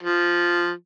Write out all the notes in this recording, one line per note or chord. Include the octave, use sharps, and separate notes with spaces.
F3